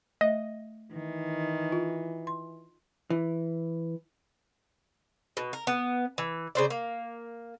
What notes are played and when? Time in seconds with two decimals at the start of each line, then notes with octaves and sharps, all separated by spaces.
0.21 A3 D#5 E5
0.92 D#3 E3
1.72 F4
2.27 C6
3.10 E3
5.37 B2
5.53 A#4
5.67 B3
6.18 E3
6.55 C#3 C5 D5
6.70 A#3